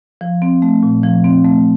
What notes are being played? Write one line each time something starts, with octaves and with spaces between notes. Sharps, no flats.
F3
C4
A3
A#2
F3
C4
A3